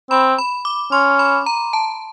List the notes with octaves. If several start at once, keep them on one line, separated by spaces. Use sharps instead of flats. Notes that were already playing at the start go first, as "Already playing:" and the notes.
C4 B5
B5
D6
C#4 C6
B5
A#5
A5